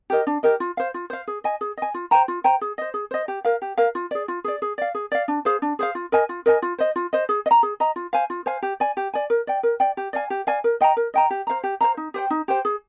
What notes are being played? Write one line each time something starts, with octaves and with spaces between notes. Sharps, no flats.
G4 A#4 D#5
D4
G4 A#4 D#5
F4
C5 F5
F4
C5 F5
G#4
D#5 G#5
G#4
D#5 G#5
F4
C5 G5 A#5
F4
C5 G5 A#5
G#4
C5 D#5
G#4
C5 D#5
G4
A#4 F5
G4
A#4 F5
F4
G#4 D5
F4
G#4 D5
G#4
D5 F5
G#4
D5 F5
D4
G#4 C5 F5
D4
G#4 C5 F5
F4
A#4 D#5 G#5
F4
A#4 D#5 G#5
F4
C5 D#5
F4
C5 D#5
G#4
D#5
A#5
G#4
D#5 A#5
F4
C5 F5 G#5
F4
C5 F5 G#5
G4
D5 G#5
G4
D5 G#5
A#4
D5 G5
A#4
D5 G5
G4
D5 F5 G#5
G4
D5 F5 G#5
A#4
D#5 G5 A#5
A#4
D#5 G5 A#5
G4
C5 F5 A#5
G4
C5 F5 A#5
D#4
G4 C5 G5
D#4
G4 C5 G5
G#4